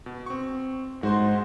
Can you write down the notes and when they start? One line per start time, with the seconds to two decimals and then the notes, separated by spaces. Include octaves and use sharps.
0.06 B2
0.26 C4 C#6
1.03 G#2 F#4 C5 C6